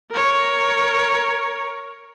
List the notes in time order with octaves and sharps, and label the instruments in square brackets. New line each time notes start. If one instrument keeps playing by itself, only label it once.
[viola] A#4 C#5